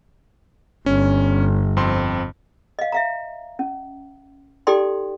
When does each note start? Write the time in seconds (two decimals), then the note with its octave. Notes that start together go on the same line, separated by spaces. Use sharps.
0.86 G1 C#4
1.77 F2 C4 C6
2.79 D#5 F5
2.92 E5 F5 A#5
3.59 C#4
4.67 D#4 G4 A4 D5 G5 C6